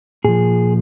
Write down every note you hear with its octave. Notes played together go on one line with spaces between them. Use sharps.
A#2 F3 G#4